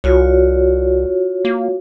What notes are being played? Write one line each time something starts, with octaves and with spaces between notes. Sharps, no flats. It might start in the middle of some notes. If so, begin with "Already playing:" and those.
C2 F4 F#4 C#5
A#3